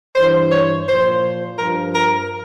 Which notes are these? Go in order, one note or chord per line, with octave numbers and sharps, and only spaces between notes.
G2 E3 C5
C#5
A#2 F3 C5
G2 F3 A#4
A#4